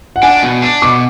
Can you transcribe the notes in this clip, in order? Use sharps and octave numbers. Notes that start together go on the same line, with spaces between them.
F#5
D4 G#5
B2
D4
B2 D6